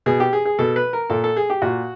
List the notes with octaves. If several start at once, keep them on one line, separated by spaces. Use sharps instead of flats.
B2 G#4
G4
G#4
G#4
B2 A4
B4
A#4
A#2 A4
A4
G#4
G4
A#2 F#4